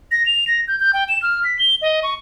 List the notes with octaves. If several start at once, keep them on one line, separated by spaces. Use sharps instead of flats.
A#6
F7
A#6
G6
G6
G5
E7
F6
B6
G7
D#5
C#6